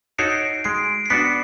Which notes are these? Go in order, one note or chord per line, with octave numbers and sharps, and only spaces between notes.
D#4 F#4 A4 C#5 C7 D7
G#3 C7 D7
C7
B3 D4 F#4 B6 C#7